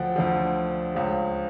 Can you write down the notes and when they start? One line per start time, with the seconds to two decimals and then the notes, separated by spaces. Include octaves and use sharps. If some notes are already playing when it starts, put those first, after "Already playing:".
Already playing: D2 D3 F3 F#5 G5
0.16 D2 D3 F3
0.95 C#2 C#3 F3